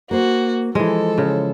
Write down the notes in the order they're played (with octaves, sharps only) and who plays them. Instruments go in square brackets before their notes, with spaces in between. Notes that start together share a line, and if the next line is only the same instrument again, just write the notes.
[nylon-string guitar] A#3 C5 [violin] F#4
[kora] E3 G#3 [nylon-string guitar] F3 [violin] A4
[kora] C#3